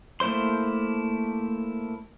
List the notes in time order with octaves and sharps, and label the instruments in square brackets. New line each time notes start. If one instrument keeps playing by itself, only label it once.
[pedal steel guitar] A3 A#3 E4 C5 C6